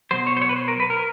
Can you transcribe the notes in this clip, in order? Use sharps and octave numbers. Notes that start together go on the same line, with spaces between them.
B2 F#3 C5
C#5
C5
C#5
B4
C5
A#4
B4
A#4